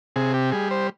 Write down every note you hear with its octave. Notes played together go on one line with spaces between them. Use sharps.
C3 G#4
G4
G3 G#4
C5